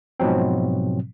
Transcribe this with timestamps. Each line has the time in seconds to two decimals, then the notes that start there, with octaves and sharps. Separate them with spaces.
0.20 G#2 B2 F3 F#3 C4